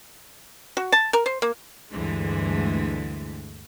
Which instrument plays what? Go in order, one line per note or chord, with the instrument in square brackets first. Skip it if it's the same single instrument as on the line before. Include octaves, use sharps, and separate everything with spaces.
[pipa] F#4
A5
A#4
C5
A#3
[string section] D2 G2 D3 E3 G#3